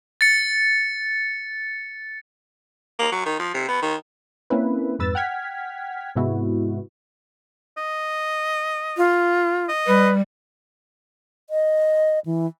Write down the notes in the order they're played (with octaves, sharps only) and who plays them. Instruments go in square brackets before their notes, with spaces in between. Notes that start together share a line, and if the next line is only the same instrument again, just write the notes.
[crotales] A6 C#7
[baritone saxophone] A#3
F#3
D#3
F3
C3
B3
D#3
[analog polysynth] A#3 C4 C#4 E4 B4
F2 G#2 B4 E6 A6
F#5 G5 F6 G#6 B6
G#2 C3 G#3 B3 E4 F#4
[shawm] D#5
[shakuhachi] F4
[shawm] D#5
[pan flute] G3 [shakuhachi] B4
[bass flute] D#5
E3